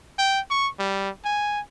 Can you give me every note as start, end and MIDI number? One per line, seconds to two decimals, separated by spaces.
0.19 0.40 79
0.50 0.68 85
0.79 1.10 55
1.25 1.60 80